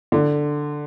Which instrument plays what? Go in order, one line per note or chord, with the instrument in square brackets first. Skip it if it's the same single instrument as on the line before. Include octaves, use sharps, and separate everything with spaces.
[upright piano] D3